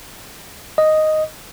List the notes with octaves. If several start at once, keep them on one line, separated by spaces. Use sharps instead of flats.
D#5